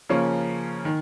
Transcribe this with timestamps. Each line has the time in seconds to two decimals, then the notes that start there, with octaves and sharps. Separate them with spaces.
0.09 C#3 F3 A#3 C#4
0.85 D#3